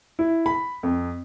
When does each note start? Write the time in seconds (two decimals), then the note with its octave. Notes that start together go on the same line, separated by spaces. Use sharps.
0.19 E4
0.46 B5
0.83 F2